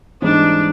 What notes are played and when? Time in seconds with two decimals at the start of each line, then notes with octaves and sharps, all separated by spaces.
0.22 G#2 E3 G3 C4 D4 D#4